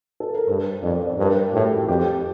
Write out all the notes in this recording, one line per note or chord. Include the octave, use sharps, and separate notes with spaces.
A4
A#4
G2 C5
F2 D5
C5
D5
C5
G2 A#4
A2 G4
G4
G4
F2 G4